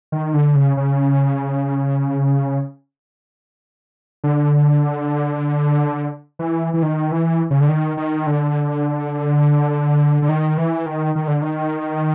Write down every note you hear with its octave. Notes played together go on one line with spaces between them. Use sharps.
D#3
D3
C#3
C#3
D3
E3
E3
D#3
E3
C#3
D3
D#3
D#3
D3
D3
D#3
E3
D#3
D#3
D3
D#3